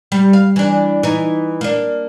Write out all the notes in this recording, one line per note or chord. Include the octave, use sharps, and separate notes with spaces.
G3
F5
E3 D4
E3 D#4
A#3 D4